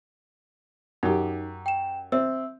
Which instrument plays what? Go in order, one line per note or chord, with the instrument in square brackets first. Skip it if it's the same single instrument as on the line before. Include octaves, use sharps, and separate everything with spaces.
[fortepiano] F#2 G4 [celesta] D#4
[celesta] G5 E7
[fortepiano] C4 [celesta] E5 E6